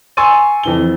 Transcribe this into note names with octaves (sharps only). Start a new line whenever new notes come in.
G#5 C6 C#6 E6 A6 D#7
F2 E3 G7